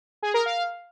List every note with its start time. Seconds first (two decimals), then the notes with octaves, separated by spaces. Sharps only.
0.22 G#4
0.34 A#4
0.46 F5